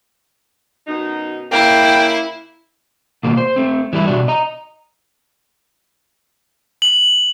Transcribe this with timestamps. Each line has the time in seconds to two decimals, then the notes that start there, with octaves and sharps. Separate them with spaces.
0.87 F#2 B2 D#4
1.52 C#3 A#3 E4 G5
3.23 B2 D#3 A#3 F4 G4
3.37 C5
3.56 A3 C4
3.93 E3 G3 E4
4.06 B2 D4 F#4
4.28 D#5 A#5
6.82 F#7